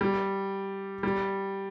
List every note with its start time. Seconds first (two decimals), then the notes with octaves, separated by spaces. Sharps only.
0.01 G3
1.03 G3